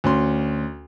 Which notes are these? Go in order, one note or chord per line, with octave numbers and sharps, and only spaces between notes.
D2 C#4 C6